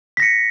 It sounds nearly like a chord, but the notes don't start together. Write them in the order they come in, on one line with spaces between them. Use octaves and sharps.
B6 A#6 C#7